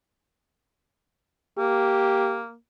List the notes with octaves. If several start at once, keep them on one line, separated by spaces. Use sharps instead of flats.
A#3 G4